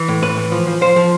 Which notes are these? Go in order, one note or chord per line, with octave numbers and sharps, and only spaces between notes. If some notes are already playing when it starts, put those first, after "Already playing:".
Already playing: E3
A2
A2 B4
E3
F3
F3
F3 C5
F3